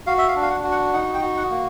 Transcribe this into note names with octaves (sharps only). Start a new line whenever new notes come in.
F#4 F5
E5
F5
D4
F5
F#5
F#4
F#5
D#4 F#5
G5
F#4
F#5
A#3